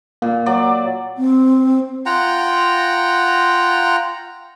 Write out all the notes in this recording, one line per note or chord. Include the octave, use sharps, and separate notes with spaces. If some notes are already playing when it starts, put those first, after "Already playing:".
A#2 A#3
F#3 D5 D6
C4
F4 F#5 G5 A#5